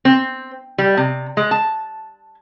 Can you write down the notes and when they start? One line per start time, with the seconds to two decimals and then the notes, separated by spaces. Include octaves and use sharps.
0.05 C4
0.78 G3
0.97 C3
1.37 G#3
1.51 A5